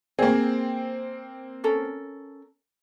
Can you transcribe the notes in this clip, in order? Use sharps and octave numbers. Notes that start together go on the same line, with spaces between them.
A#3 C4 G#4
C#4 A4 A#4